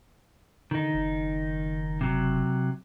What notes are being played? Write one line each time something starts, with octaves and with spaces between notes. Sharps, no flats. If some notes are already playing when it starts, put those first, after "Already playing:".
D3 D#3 D#4
F#1
C3 F#3